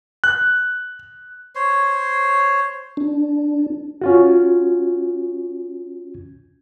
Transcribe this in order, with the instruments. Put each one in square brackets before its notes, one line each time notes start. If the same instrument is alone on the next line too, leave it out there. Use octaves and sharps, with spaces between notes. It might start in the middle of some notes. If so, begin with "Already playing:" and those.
[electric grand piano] F#6
[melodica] C5 C#5
[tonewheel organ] D4
[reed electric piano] C#4 F4 F#4